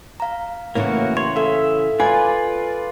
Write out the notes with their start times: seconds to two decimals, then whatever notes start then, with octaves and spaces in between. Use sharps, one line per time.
0.20 F5 A#5
0.75 A2 C#3 E3 A#3 F#4
1.17 C#5 C6
1.36 A4 E5 F5
2.00 F4 B4 D5 G#5